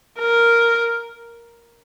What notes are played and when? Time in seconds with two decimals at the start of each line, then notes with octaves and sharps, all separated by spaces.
0.19 A#4